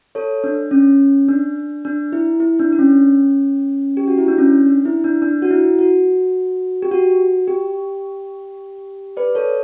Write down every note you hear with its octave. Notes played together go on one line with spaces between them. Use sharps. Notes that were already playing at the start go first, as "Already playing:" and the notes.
A4 C#5
D4
C#4
D4
D4
E4
E4
D4
D4
C#4
G4
F#4
E4
D4
C#4
D4
E4
D4
D4
F#4
E4
F#4
G4
F#4
G4
B4 D5
A4 C#5